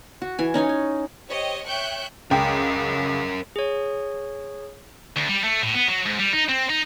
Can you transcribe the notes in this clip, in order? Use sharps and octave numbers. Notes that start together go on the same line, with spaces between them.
F#4
E3 G#5
C#4 D#4 C#5 G#5
G#5
G4 C5 C#5 D#5 G5
C#5 E5 G5 C#6 F#6 G6
C#2 C#4 A#4 G5
G#4 C#5
D2
G3
A3
A2
B3
F#3
G#2
G3
D#4
C4
D#4